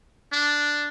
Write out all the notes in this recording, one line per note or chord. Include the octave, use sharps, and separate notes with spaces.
D4